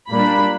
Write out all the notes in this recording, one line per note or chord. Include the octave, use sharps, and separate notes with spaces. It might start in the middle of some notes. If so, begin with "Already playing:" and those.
A#2 G3 A#3 D4 B5